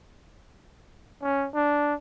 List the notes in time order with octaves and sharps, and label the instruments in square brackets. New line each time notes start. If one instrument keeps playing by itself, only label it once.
[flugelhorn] C#4
D4